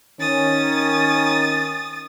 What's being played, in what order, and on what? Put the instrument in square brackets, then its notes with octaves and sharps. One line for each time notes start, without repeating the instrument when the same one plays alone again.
[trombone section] D#3 C#4 [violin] D#6 A6